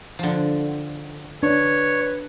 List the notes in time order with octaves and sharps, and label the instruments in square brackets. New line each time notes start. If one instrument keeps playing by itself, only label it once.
[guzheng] D3 F3
[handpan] D4 [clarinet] B4 [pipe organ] C#5